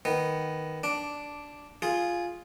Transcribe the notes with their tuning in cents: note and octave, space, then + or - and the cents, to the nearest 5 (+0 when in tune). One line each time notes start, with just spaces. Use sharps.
D#3 +0 B3 +0
D4 -5 D6 +0
F4 +0 G#4 +0